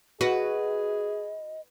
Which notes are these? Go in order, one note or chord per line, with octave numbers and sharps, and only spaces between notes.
F#4 G#4 B4 D#5